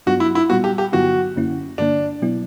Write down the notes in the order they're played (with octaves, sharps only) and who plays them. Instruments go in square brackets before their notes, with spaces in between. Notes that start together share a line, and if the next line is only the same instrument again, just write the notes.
[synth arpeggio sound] G2 F#3 B3 D4 [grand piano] F#4
[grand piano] E4
E4
[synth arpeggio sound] A#2 G3 B3 [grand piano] F#4
[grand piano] G4
G4
[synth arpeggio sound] G2 D3 F#3 B3 E4 [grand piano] F#4
[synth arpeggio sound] F#2 D3 A#3 C#4 E4
[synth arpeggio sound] G2 D3 A#3 [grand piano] D4
[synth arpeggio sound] B2 F#3 B3 E4